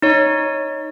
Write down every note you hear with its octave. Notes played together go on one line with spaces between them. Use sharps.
D#4 C#5